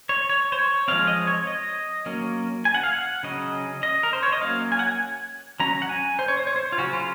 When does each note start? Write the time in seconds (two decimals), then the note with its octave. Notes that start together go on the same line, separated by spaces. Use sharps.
0.09 C#5
0.29 C#5
0.52 C5
0.59 C#5
0.88 F3 G#3 C4 F5
1.07 D#5
1.27 C#5
1.47 D#5
2.06 F#3 A#3 C#4
2.65 G#5
2.75 F#5
2.83 F5
2.93 F#5
3.23 C#3 F#3 C#4 D#5
3.83 D#5
4.03 A#4
4.13 C5
4.23 C#5
4.32 D#5
4.41 F#3 A#3 C#4 F5
4.72 G#5
4.79 F#5
4.86 G#5
5.60 F#3 C#4 A#5
5.82 F#5
5.89 G#5
6.19 C5
6.28 C#5
6.37 C5
6.47 C#5
6.56 C5
6.72 F4
6.78 C#3 F#3 C#4 F#4
6.93 F4